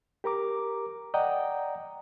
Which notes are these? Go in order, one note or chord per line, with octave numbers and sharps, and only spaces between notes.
G4 A#4 A#5 D6
D5 D#5 F#5 G5 A#5